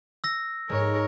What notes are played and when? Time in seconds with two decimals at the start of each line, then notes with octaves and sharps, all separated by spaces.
0.24 E6 A#6
0.69 G#2 G#3 A#4 C#5